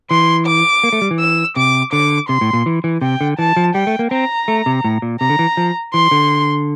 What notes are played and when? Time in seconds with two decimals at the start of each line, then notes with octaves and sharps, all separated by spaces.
0.11 E3 C6
0.47 D6
0.83 A#3
0.93 A3
1.01 G3
1.11 E3
1.20 E6
1.56 C3 D6
1.93 D3 D6
2.29 C3 C6
2.41 A2
2.53 A#2
2.66 E3
2.84 E3
3.01 C3 G5
3.21 D3
3.39 E3 A5
3.57 F3
3.75 G3 G5
3.87 A3
3.99 A#3
4.11 C4 A#5
4.48 A3
4.66 C3
4.84 A2
5.02 A#2
5.20 C3 A#5
5.29 D3
5.39 E3
5.57 F3
5.94 E3 C6
6.11 D3